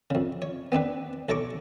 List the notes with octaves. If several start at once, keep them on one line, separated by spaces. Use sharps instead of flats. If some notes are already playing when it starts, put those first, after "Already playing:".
F2 C#3
C#5
B3 C4 D4 B4
B1 A4 C#5 A#5 C#6 D6